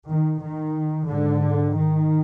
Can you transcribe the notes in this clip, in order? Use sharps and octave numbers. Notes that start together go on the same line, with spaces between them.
D#3
D#3
G#2 D3
D#3